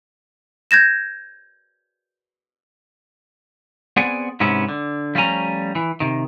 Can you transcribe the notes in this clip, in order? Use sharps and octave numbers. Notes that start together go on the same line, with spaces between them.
G6 G#6 A#6 E7
B3 C4 G#4 D5 F#5 G#5
G#2 C3 B3 C#4 E4
D3
F3 G3 A3 C#4 G#5 A#5
E3
C3 D#3